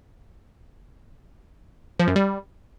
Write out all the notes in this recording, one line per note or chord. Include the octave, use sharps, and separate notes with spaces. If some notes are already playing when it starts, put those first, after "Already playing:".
F3
F#2
G3